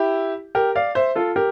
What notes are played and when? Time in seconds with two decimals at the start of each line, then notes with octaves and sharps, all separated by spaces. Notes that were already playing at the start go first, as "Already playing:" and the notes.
Already playing: E4 G4
0.55 G4 A#4
0.75 D5 F5
0.95 C5 E5
1.16 F4 A4
1.36 G4 A#4